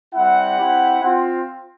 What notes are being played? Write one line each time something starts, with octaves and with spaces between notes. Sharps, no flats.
G3 C4 E4 F#5
C4 E4 G4
C4 F4